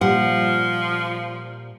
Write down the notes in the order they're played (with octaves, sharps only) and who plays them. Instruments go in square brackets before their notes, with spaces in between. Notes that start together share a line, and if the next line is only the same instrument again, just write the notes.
[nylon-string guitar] A#2 G3 F#5 [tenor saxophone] F3